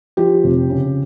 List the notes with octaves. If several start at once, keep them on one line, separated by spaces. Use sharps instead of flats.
F3 G4
F1
C#3